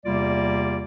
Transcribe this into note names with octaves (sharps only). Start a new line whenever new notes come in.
E2 C3 G3 A#3 F4 D5